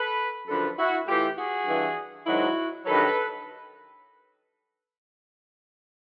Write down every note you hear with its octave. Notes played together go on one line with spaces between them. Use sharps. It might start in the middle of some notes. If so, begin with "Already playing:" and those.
Already playing: A4 B4
F#2 D3 F3 A4 B4
E4 F#4
A2 E3 F4 G4
F#4 G#4
G2 E3
G#2 D#3 F#3 E4 F#4
G2 D#3 F#3 A4 B4